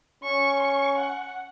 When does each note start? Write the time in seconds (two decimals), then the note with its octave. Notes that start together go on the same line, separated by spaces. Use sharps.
0.23 C#4 C#6
0.60 C#6
0.98 F#5